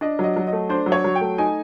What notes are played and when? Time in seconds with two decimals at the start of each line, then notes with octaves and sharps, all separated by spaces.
0.01 D4 D#5
0.19 F#3
0.24 D#5
0.36 F#3
0.47 D#5
0.53 A3
0.69 D4 C5
0.86 F#3
0.92 C#5
1.04 F#3
1.15 G5
1.21 A3
1.38 D#4 G#5